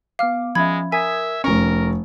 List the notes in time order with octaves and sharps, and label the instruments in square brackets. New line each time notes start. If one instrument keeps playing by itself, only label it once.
[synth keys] B3 D6 [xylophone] F5 F6
[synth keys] F3 C#4 E5 [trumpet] G#3 [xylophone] B5 G#6
[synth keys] A#4 D#6 G#6 [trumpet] E5 [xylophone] G#5 B6
[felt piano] F1 C#6 [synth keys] C#4 [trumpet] A#4